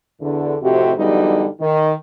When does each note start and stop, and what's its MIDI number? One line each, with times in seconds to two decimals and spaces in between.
0.20 0.54 40
0.20 0.54 50
0.61 0.91 41
0.61 0.91 45
0.61 0.91 48
0.61 0.91 66
0.61 0.91 67
0.97 1.45 40
0.97 1.45 50
0.97 1.45 54
0.97 1.45 55
0.97 1.45 63
1.59 1.92 51